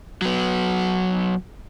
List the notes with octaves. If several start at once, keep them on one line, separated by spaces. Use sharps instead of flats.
F#3 B3